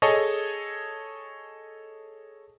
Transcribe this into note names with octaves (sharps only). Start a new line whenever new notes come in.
G#4 A4 C#5 D#5